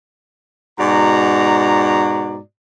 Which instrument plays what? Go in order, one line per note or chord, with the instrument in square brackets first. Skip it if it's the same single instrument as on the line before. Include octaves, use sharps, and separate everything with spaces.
[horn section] G#2 B2 F#4 D5 A#5